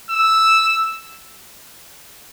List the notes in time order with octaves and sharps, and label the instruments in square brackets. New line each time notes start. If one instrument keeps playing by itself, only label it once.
[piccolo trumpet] E6